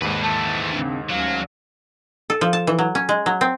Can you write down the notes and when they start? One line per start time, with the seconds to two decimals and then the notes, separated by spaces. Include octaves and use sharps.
0.02 D#2 G#2 D4 B4
0.23 E3 A3 A5
0.71 C#3 C4 D4
1.10 D2 F#3 C#4 F5
2.30 A4
2.41 F3
2.53 A5
2.67 E3
2.79 F#3
2.95 C#4
3.09 G#3
3.26 F#3
3.41 C4